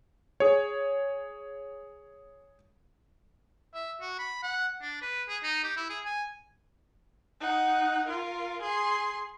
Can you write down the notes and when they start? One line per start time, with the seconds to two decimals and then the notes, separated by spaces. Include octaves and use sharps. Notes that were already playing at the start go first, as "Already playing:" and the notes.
0.40 G#4 C#5
3.74 E5
4.01 F#4
4.19 B5
4.43 F#5
4.82 D4
5.02 B4
5.29 G#4
5.44 D#4
5.63 G4
5.77 E4
5.90 G#4
6.05 G#5
7.41 D#4 F#5
8.08 F4 A#4
8.62 G#4 C6